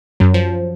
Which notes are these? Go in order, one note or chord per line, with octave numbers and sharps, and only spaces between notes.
F#2 F#3
F3